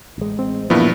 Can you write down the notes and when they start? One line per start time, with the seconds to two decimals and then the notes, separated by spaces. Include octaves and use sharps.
0.18 A1 G#3
0.39 C4
0.70 G2 A#2 E3 F3 A#3 B3 E4